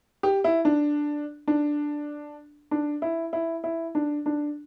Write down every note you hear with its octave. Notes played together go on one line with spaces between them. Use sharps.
G4
E4
D4
D4
D4
E4
E4
E4
D4
D4